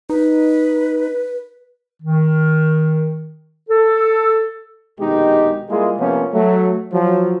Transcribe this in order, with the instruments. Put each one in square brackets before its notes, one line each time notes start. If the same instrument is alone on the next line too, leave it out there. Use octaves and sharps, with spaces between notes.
[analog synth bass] D#4 [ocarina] B4
[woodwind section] D#3
A4
[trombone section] A#1 B2 D#3 G#3 D#4 G4
G3 G#3 A#3 E4 F4 G#4
C3 F3 A#3 B3 C#4
F#3 A3
F3 F#3